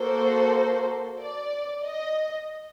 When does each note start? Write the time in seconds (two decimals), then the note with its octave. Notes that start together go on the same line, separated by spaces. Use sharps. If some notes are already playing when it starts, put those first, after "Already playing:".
Already playing: A#3 F#4 A4 C5
1.21 D5
1.86 D#5